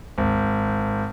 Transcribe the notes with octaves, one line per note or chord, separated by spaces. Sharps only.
G#1